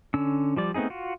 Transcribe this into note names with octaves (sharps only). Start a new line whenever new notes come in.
D3 C#4 E6
F3 G3 D5
A3 B3 C4 D#4 G#4
F4 F#4